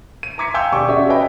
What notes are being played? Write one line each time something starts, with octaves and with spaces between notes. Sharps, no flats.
D#7
A#5 C6 D6 G#6 B6 C#7
F5 G5 G#5 C6 E6 G6
E1 G4 D5 C#6 D6
C#4 F#4 G#4 D5 E5
B4 C#5 D#5 E5 G5 B5